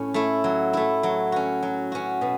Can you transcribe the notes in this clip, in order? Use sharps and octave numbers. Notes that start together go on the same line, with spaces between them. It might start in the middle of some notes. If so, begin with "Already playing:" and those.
Already playing: A2 C#4
A3 E4
F#3
A3 E4
F#3
C#4 F#4
F#3
C#4 F#4
B2